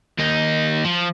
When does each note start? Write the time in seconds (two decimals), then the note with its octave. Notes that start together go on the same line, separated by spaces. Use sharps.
0.18 D#2 D#4
0.84 F3